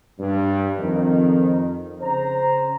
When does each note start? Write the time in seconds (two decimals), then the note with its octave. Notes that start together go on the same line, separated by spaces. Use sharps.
0.19 G2
0.78 F2 D#3
2.02 C#3 C5 A#5